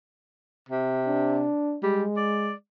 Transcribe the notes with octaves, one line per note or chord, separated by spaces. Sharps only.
C3
D4
G3 G#3
D5